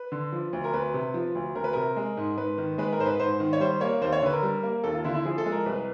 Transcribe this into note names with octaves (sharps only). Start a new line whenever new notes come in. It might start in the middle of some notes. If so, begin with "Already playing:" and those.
Already playing: B4
D3
F3
D2
A#4
D2 B4
C3
F3
D2
D2 A#4
B4
C3 A#4
G#3
G#2
G#2 B4
D#3
G#3 B4
A#4
G#2 C5
B4
G#2 C5
D#3
C#5
G3 C5
A#3 C#5
D#2 C5
C#5
D3 B4
A#4
G3
A#3
D#2 A4
F4
D3 E4
E4
F3 G#4
A4
G#3
A#4
C2 B4